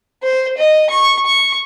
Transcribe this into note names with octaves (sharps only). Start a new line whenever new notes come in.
C5
D#5
C#6
C#6